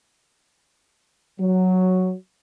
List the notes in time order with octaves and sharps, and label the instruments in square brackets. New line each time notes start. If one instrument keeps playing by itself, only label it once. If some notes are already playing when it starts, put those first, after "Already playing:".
[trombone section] F#3